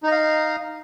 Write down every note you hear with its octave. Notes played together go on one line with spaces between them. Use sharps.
D#4 D#5 F5